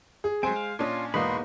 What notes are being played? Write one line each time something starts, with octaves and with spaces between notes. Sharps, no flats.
G#4
F#3 G#3 C4 C5 G#5 D7
F5
A#2 C#4 D4 F4 D5 D#5
E2 G#2 B2 A#3 B3 D#4 B5 C6